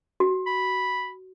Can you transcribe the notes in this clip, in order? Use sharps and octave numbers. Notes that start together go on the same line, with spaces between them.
F#4
B5